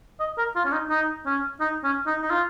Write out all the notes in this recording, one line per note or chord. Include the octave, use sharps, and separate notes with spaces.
D#5
A#4
F4
C#4
D#4
D#4
C#4
D#4
C#4
D#4
D#4
F4